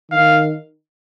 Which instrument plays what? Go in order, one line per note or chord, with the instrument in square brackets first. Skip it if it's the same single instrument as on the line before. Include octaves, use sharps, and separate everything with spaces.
[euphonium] D#3 [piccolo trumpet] F5